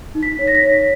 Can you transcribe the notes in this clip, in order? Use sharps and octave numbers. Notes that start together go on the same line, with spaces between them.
D#4
B6
C#5
A#6
B6
C#5